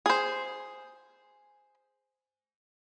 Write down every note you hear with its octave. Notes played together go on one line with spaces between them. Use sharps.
G#4 C5